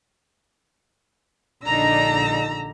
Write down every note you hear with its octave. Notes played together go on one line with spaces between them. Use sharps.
A#1 D3 D4 D#4 A#5 E6 A#6